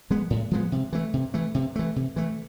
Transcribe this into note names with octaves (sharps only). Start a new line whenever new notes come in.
F3 G#3 B3
A2
F3 G#3 B3
C3
E3 A3
C3
E3 A3
C3
E3 A3
C3
E3 A3